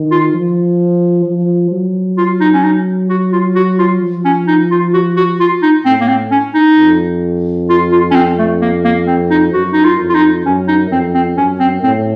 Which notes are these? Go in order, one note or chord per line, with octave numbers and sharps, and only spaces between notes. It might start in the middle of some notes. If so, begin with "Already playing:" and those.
Already playing: D#3
F4
F3
F3
F#3
F4
D#4
C#4
D#4
F#4
F4
F#4
F4
F3
C#4
D#4
F4
F#4
F#4
F4
D#4
A2 C4
A#3
C4
C#4
D#4
F2
F4
F4
C#4
C4
A3
A#3
A#3
C4
D#4
F#2 F#4
D#4
F4
F2
F4
D#4
F#2 C#4
D#4
F2 C4
C4
F#2 C#4
C4
A2 C4